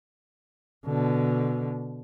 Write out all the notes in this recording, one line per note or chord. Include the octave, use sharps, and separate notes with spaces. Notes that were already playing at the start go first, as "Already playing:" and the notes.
B2 D3